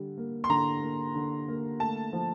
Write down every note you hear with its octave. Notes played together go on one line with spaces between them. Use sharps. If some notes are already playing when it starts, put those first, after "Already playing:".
Already playing: D3 G3
A#3
C6
D3 A#5
A#3
D3
A#3
A3 A5
F3